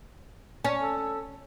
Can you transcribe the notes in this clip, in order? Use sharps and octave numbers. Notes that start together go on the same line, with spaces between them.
C#4
A4